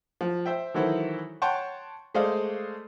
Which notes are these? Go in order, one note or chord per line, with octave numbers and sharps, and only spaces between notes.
F3
C5 E5 G5
D#3 E3 F#3 E4 A4 C5
C#5 F#5 G5 A5 C6 C#6
G#3 A3 C5 D5 D#5 F5